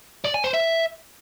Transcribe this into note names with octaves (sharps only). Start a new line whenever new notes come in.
D5
G#5
C5
E5